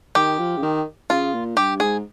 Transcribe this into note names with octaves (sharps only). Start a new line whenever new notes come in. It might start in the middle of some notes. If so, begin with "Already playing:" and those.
D#3 G4
F3
C#3
D#3
C#3 F4
A#2
G2 G4
G#2 G#4